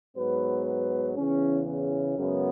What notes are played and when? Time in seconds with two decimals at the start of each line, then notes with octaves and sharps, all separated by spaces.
0.16 G#2 F#3 B3 B4
0.65 B4
1.16 E2 C#3 E3 C#4
1.66 C#4
2.17 F#2 C#3 G#3 B3